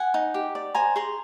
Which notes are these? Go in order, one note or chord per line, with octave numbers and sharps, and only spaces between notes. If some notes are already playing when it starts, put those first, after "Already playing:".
Already playing: F#5 G#5
D#4
G4
D5
C5 G#5 A#5
G#4 A#5 C6